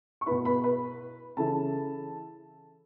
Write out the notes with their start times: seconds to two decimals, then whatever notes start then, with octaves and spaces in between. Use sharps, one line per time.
0.21 C#6
0.26 B2 B3 E4 B4 B5
0.45 B4 B5
0.64 B4 B5
1.37 C#3 E3 C#4 E4 A4 A5